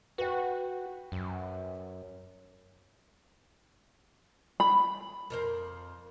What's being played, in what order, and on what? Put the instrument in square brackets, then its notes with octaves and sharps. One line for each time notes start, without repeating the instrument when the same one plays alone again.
[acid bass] F#4 [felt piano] B4 G5
[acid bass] F#2
[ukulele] B5
[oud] F2 A#4 C5